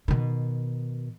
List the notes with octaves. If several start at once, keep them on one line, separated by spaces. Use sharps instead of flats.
B2 D#3